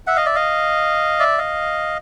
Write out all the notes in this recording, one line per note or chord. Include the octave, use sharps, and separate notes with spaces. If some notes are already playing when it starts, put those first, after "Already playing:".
E5 F#5
D#5 F5
D5 E5
D#5 F5
D5 E5
D#5 F5